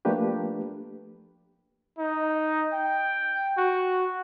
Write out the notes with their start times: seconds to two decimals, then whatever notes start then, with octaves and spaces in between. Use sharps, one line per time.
0.05 F3 A3 A#3 D4 G4 B4
1.99 D#4
2.73 G5
3.58 F#4